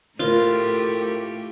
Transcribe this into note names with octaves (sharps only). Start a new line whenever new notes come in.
A2 A3 F4 G4 A#4 C5